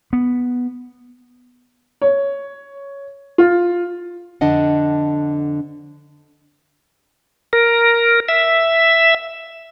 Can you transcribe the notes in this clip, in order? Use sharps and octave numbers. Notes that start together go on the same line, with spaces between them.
B3
C#5
F4
F2 D3 D4 D#5 F#5
A#4
E5